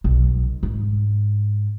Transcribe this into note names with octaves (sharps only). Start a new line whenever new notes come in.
B1
G#2